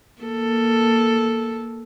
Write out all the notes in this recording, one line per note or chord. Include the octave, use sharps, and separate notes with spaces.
A#3 A4